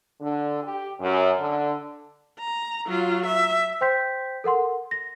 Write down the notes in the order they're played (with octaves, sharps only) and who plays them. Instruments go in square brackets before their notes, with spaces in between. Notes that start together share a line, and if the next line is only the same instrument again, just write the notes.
[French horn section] D3
G4
F#2
D3
[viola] A#5
F#3 F4
E5
[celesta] C5 G5 C6 G6 B6
A4 A#4 F#5 C6
A#6